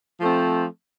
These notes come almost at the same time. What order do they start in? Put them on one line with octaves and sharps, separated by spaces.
F3 A3 C4